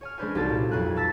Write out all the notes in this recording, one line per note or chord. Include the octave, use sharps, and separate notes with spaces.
C#5 G#5 F6
G#3 C#4 D4 B4 C5 G#5
C2 C3 D#4 F#4 A4 A5
A#2
B1 F2 A#3 G#5 F#6
A5 E6 A6 B6